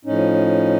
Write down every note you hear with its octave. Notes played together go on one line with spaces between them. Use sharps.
A2 F3 C#4 D#4